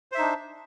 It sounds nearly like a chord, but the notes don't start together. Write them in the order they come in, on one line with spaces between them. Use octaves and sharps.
C5 E5 D#4 D4